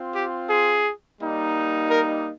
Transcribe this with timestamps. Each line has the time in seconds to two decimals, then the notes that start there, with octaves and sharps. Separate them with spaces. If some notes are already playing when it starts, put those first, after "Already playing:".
Already playing: C4 F4
0.15 G4
0.49 G#4
1.20 G3 A#3 D#4
1.90 A#4